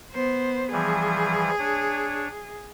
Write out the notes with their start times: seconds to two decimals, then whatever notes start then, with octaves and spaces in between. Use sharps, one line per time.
0.13 B3 C5
0.72 E3 F3 G3 G#4
1.59 D4 C#5